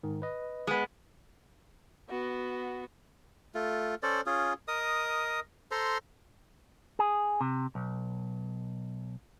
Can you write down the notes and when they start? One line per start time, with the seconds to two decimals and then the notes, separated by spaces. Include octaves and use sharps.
0.03 G#2 D#3
0.22 B4 D#5
0.67 G#3 B3
2.09 B3 F#4
3.55 A3 F4
4.03 C#4 A4 C5 D5
4.26 C#4 F4 G#4
4.68 A#4 D#5 D#6
5.71 A4 C5 A#5 C6
6.99 G#4
7.41 C3
7.75 B1